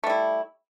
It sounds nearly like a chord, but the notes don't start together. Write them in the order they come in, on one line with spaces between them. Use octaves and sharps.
A3 G3 E4